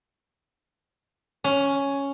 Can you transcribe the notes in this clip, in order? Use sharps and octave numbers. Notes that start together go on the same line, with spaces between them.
C#4